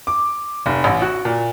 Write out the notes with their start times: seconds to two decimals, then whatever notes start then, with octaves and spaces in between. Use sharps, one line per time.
0.07 D6
0.66 F1
0.84 A1
1.02 F#4
1.25 A#2